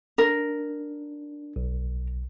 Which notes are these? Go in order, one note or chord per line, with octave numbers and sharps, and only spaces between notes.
D4 A#4
B1